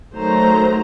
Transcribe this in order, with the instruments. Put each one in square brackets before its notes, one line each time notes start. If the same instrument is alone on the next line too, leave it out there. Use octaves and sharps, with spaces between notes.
[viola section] D#3 F#3 A3 C5 A#5